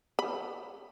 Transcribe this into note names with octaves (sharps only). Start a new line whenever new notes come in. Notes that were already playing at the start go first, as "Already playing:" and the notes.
B5